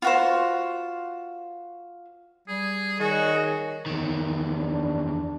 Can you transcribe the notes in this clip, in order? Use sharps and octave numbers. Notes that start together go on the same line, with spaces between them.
F4 F#4 C5
G3 G#4
D#3 F#4 G#4 C#5 D#5
E2 D#3
D4